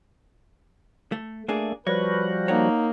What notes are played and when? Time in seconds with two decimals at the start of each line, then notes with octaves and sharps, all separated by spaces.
1.12 A3
1.48 A3 A#3 D4 G#4
1.87 F3 G3 F#4 B4 C#5
2.48 A#3 D#4 C#5 F#5